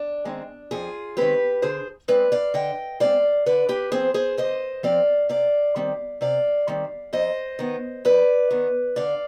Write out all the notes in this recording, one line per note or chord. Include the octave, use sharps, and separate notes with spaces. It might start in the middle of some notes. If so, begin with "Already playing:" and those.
Already playing: D4
D#3 G#3 C4
F2 F4 G#4
D#3 G#3 C4 G4 B4
D3 G#4 C5
G#3 C4 B4 D5
D5 F5
D3 D#5 G5
G#3 C4 D5 F5
D3 B4 D5
G4 B4
F3 C4 G#4 C5
G#4 C5
D3 C5 D#5
F3 C4 D5 F5
C3 D5 F5
D#3 G3 C4
C3 D5 F5
D#3 G3 C4
F2 C5 D#5
D#3 B3
F2 B4 D5
D#3 B3
D3 D5 F5